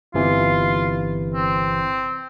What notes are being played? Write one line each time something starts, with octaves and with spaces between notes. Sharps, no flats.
G1 C3 E3 F4
C4